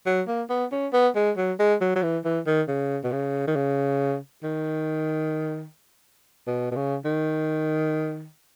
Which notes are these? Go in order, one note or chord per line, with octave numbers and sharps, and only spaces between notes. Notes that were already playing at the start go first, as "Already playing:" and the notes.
F#3
A#3
B3
C#4
B3
G#3
F#3
G#3
F#3
F#3
E3
E3
D#3
C#3
B2
C#3
D#3
C#3
D#3
B2
B2
C#3
D#3